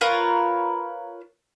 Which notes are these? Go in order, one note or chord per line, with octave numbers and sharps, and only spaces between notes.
F4 A#4 B4 C#5